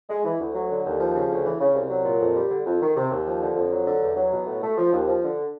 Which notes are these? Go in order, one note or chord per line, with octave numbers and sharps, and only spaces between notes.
G#3
E3
D2
F#3
D3
D#2
F3
C#3
D2
E3
C#3
C2
F#3
A#2
F2
G3
D3
F2
D#3
C3
D#2
F3
D3
F2
F#3
D3
E2
F#3
B2
A2
A3
F3
D#2
F3
D3